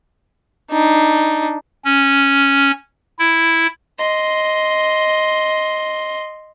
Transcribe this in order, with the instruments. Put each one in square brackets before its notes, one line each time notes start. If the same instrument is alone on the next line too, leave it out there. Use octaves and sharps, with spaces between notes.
[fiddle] D4 D#4
[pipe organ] C#4
E4
[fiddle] D#5 C6